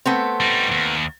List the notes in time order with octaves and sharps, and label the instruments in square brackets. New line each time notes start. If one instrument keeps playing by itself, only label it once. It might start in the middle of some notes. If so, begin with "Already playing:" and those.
[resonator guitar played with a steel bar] A3 B3 C4
[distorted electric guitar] G3 D#4
D#2